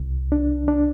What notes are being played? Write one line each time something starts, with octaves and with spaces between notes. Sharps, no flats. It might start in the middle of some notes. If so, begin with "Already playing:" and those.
Already playing: C2
D4
D4